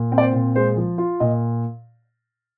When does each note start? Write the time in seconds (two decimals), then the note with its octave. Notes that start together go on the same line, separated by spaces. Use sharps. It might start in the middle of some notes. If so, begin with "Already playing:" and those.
Already playing: A#2
0.12 C4
0.18 D5
0.22 C5
0.33 A#2
0.56 G#3 C5
0.77 F3
0.98 F4
1.20 A#2 D#5